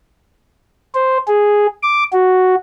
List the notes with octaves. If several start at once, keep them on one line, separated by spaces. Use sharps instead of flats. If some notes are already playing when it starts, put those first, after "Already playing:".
C5
G#4
D6
F#4